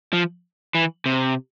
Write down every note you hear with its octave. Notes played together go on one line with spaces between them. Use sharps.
F3
E3
C3